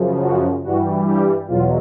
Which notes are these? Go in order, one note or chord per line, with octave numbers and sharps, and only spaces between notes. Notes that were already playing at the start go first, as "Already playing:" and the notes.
Already playing: F#2 C#3 F3
F#4
G2 E3 G3 F#4
G4
E2 B2 F#3 F4